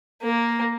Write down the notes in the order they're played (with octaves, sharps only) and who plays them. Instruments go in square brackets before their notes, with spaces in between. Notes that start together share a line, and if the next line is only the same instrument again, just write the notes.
[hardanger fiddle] A#3